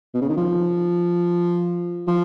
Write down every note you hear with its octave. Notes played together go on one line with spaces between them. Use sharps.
B2
C#3
D#3
F3
F3